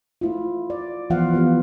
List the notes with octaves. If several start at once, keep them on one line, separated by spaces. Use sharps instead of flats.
A3 E4 F4
D5
E3 F3 B3 F4 F5 F#5
E3 B3 G4